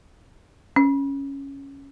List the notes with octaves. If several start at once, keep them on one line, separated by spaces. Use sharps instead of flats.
C#4